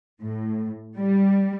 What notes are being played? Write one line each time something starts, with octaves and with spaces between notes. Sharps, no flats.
A2
G3